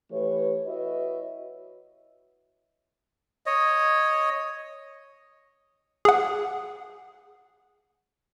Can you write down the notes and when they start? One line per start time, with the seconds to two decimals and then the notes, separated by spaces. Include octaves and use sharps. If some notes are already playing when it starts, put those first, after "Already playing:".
0.12 E3 A3 G4 B4 C#5
0.66 E4 F#4 B4 C#5 D#5 E5
3.46 C#5 D#5
6.05 G#4 F#5